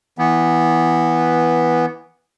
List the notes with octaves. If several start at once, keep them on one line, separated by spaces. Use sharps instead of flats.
E3 B3